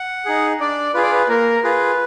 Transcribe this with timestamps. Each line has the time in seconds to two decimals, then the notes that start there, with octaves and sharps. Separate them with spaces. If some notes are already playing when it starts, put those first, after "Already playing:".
Already playing: F#5
0.25 D#4 G#4
0.60 D4 D5
0.94 F4 G#4 B4
1.03 D5
1.12 B4
1.29 A#3 A#4
1.63 F4 G#4 B4